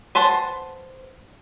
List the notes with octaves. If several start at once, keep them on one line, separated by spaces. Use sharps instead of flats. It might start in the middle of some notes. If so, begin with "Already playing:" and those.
B4 C5 F#5 A5